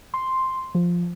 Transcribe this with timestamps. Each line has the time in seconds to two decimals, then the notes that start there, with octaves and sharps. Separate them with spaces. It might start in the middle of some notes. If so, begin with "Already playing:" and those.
0.14 C6
0.75 F3